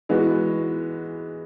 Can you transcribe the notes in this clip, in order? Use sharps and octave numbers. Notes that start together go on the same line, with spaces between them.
E3 G#3 B3 F#4